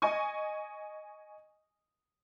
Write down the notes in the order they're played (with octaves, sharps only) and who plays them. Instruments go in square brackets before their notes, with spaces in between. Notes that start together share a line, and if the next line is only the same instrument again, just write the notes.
[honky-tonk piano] D#5 G#5 C#6